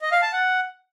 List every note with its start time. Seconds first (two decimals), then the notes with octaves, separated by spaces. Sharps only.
0.02 D#5
0.12 F5
0.22 A5
0.33 F#5